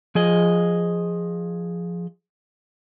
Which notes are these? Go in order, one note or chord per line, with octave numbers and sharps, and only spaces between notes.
F3 G#4 D#5